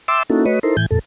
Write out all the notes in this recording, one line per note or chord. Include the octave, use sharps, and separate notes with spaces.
E5 G5 A5 C6 D6 E6
A#3 C#4 D#4 E4 F#4 A4
A3 F#4 B4 C#5 D#5
D#4 E4 A4 A#4 C5
A2 E3 G#5 G6
F2 A#2 A4